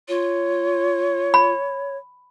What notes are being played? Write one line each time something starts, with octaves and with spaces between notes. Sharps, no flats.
F4 C#5
B5